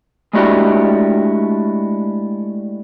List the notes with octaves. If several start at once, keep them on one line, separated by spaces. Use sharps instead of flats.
G#3 A3 D4 E4 F#4 G4